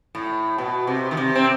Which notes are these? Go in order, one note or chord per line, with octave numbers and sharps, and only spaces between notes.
A2
B2
C3
D#3
C3
C4